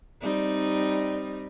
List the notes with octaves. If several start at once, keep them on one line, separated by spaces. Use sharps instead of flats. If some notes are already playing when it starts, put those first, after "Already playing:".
G3 C4 D#4